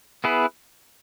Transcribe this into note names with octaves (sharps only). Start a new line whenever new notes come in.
B3 E4 G#4 B4